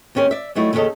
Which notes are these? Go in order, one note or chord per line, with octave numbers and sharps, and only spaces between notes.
D#2 C4 C#4 G4 A#4
D5 E5
F#3 G3 A3 D#4 E4
D#2 C#3 C#4 D4 A4 D#5